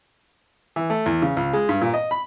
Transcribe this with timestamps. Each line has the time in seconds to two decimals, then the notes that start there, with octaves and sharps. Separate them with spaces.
0.76 E3
0.90 A3
1.06 E2
1.22 C#3
1.37 C#2
1.53 G#3
1.69 G2
1.81 A#2
1.94 D#5
2.11 B5